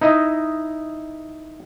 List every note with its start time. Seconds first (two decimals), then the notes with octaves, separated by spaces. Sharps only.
0.01 D#4 E4 D#5